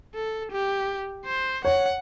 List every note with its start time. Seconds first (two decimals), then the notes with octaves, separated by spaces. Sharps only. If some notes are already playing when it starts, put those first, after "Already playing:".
0.14 A4
0.51 G4
1.25 C5
1.65 C#5 F#5